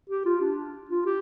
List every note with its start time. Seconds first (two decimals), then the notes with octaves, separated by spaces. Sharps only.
0.10 G4
0.25 F4
0.41 D4
0.89 F4
1.05 G4